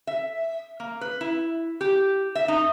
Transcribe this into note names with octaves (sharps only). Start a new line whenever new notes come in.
E5
A#3
B4
E4
G4
E5
D#4